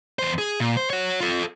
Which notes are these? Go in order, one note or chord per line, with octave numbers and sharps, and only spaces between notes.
E2 C5
G#4
A#2
C5
F#4 C#5
F4 A4